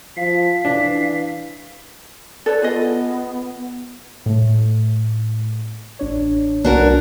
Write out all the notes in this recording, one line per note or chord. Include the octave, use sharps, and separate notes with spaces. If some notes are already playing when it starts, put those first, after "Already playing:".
F3 F5 B6
E3 D4
A4 B4 C#5 D5
B3 F4 G#4 D#5
A2 A3
A1 D4 C#5
C2 D4 F#4 A#4